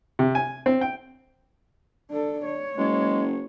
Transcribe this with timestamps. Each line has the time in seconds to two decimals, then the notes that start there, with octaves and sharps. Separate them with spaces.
0.19 C3
0.35 G#5
0.66 C4
0.81 G5
2.10 D4 A4
2.45 C#5
2.77 F#1 G#3